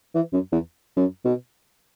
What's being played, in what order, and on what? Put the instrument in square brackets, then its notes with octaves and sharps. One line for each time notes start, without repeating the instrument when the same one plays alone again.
[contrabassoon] E3
F#2
E2
F#2
B2